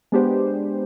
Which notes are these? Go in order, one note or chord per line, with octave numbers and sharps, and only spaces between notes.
G#3 B3 D4 G4 C5